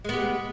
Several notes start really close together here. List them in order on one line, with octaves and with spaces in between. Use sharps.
G#3 B3 G4